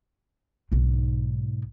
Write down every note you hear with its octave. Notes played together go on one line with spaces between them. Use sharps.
B1 G#2